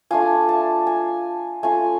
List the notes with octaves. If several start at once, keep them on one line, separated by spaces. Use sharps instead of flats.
A3 D4 F4 G#5
A5
G#5
A3 C#4 F4 G#5